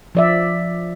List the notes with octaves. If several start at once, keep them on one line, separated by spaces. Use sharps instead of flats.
F3 D5 E5